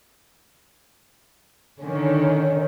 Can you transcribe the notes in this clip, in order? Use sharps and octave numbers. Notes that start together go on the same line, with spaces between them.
D3 D#3 C#4